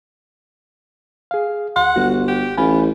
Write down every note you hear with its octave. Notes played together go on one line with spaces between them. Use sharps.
G#4 F5
D2 F#5 C6
G1 F#4
G4
A1 F4 G#5 B5